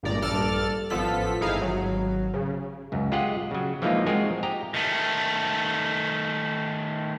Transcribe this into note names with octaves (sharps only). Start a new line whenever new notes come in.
G#1 G2 A#2 G#3 D5 A#5
A#1 G2 A4 D5 F6 A6
A1 F3 B3 F4 A4 B6
G#1 D#4 E4 G#4 F5
G#1 F#3
C#3
C#2 F#2
G#3 F4 G4 G#4 D#5 F#5
C#3 F#3
E3 F3 G#3 A#3 D#4 F4
G#3 C4 F4 F#4 A#4 G#5
G4 D#5 A#5
D#3 A3